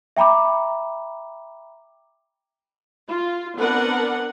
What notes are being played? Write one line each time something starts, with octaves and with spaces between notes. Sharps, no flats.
E5 G5 A#5 B5 D6
F4
B3 C4 D4 A#4 B4 F#5